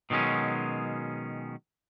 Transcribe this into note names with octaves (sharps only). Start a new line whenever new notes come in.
B2 D#3 F#3 G#3 C#4